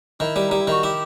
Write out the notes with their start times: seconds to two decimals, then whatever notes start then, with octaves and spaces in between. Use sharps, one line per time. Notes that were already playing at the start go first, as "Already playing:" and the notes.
0.20 D#3 E4
0.36 G3
0.48 G3 D#4
0.60 E4
0.67 D#3 F#4
0.83 E4 G4